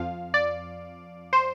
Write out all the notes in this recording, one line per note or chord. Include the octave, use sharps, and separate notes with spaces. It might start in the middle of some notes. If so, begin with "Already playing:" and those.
Already playing: F2 F3 F5
D5
C5